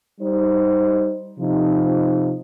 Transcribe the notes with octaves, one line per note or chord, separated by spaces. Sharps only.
G3 D#4 C5
C3 F3 D#4